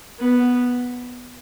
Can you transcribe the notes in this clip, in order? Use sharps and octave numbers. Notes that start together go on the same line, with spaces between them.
B3